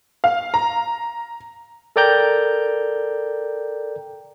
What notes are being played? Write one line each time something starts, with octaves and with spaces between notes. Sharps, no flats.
F5
A#5
A4 A#4 D5 G5 A#5 G6